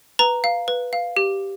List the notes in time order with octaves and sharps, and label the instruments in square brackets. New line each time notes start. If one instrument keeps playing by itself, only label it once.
[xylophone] B4 A#5
F5
B4
F5
G4